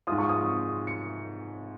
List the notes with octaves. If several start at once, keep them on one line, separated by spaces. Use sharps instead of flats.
G#2 G#3 F4 D#6
C#6
D#6
C#7